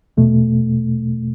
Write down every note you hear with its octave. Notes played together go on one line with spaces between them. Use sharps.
E2 B2 A3